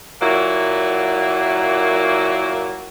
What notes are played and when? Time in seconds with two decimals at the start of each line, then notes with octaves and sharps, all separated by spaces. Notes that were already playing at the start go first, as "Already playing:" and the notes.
0.21 A#2 F#3 A#3 E4